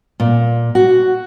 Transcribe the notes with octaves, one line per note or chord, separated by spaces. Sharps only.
A#2
F#4